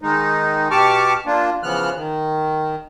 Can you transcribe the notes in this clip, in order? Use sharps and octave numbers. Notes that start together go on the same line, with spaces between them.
D#3 G#3 D#4
B2 G4 A5 C#6 D6 F6
A#3 D4 F4
C#3 E3 F3 B3 F6 F#6
D#3